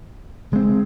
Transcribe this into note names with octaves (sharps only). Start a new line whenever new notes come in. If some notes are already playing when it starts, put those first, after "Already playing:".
C#3 G#3 C4